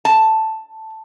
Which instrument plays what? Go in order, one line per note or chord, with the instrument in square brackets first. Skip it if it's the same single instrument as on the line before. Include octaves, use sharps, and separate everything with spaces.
[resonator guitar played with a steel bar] A5